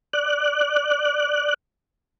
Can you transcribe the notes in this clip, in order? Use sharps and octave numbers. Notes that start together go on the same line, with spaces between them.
D5 F#6